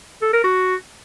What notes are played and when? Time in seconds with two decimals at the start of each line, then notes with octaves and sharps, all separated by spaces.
0.22 A4
0.33 A#4
0.44 F#4